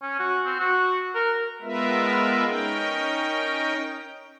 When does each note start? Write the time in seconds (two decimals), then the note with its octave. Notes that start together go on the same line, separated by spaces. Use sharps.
0.02 C#4
0.19 F#4
0.46 C4
0.59 F#4
1.15 A#4
1.62 G#3 B3 F4 A#4 B4 E5
2.47 C#4 D#4 A#4 G5